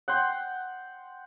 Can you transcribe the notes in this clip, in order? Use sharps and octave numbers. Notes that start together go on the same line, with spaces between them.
F#5 G5 C6